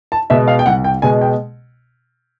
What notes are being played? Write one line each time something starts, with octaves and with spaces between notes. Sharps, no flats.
A5
B2 G#3 E5
F5
G5
C2 F#5
G5
B2 G#3 G#5
G5